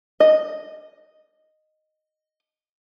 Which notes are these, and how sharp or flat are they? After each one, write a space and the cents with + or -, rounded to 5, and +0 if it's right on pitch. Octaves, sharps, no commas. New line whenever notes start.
D#5 -5